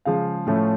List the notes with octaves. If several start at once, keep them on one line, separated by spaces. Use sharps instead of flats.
C#3 F3 G#3 F5
A2 F3 A3 C#4